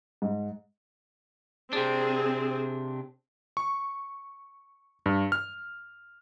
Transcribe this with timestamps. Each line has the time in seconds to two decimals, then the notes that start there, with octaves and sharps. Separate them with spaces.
0.22 G#2
1.73 C3 C4 D4 G#4
3.57 C#6
5.06 G2
5.32 F6